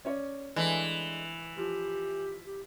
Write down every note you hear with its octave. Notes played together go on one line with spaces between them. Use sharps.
C#4 C#5 D5
E3 G#3 A3 D4
F3 G4
G4